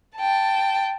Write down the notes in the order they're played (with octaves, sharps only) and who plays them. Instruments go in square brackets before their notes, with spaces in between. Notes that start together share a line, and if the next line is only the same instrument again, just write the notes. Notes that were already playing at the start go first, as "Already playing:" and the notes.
[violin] G5 A5